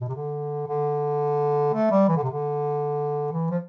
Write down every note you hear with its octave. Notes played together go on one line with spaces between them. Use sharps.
B2
C3
D3
D3
A3
G3
E3
D3
C3
D3
E3
F3